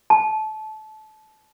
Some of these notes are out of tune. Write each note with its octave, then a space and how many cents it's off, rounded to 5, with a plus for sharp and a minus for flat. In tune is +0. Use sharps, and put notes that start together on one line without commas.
A5 -25